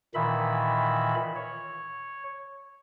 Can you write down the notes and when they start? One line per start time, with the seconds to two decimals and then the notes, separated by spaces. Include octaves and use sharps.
0.14 A#2 D#3 E3 E5 B5
1.35 C#5